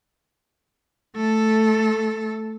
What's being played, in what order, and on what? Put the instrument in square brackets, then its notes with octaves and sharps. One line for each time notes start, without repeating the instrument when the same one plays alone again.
[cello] A3 A4